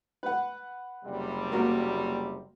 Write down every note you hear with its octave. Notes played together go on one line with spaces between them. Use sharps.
B4 F#5
F#1 C3 G3
A#3 F#4 A#4